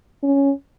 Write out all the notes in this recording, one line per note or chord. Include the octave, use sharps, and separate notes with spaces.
C#4